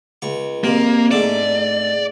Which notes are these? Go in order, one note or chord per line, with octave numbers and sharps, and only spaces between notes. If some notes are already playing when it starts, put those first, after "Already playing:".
C#2 C#6
F2 C3 A#3
G#2 A3 D4 D5